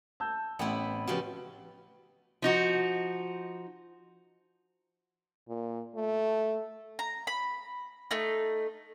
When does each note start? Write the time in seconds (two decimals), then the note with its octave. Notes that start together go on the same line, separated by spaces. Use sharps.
0.20 A5 E6 G6
0.59 A1 B3 C4 E4
1.08 C#3 F3 F#4 G4 B4
2.42 F3 D#4 F#4
5.48 A#2
5.96 A3
6.99 A#5
7.27 B5
8.11 A3 D#4